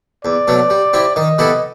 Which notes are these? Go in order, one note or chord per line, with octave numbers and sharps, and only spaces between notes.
E2 D5
B2 F#3 A3
G3
C4 E4 G4
D#3 D#5
G3 B3 E4 A4